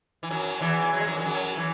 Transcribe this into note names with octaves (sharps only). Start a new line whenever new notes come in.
E3
F#2 F#3
E2 E3
F#3
G#3
F#2 F#3
E3
F#2 F#3
E3